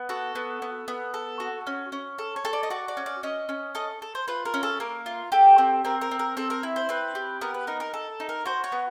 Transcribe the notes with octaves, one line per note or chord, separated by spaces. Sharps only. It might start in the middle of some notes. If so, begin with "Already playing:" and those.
Already playing: B3
F#4 A4
B3
B3
B3
A4
F#4
C#4
C#4
A4
C#5
A4
D5
D#5
F#4 D5
D5
C#4
D5
C#4 D#5
C#4
A4 D#5
A4
C5
F4 B4
A#4
C#4
A4
A#3 A#4
F4
G4 A4
C4
C4 A#4
A#4
C4
A#4
C4 A4
A#4
E4
C5
C4 B4
G4
B3 A#4
B4
D#4 A#4
A#4
A4
D#4
A#4
F#4 C5
C#5
B3